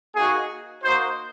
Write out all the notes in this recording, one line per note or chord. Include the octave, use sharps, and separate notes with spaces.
A#3 D#4 F#4 G#4
A#3 D#4 F#4 C5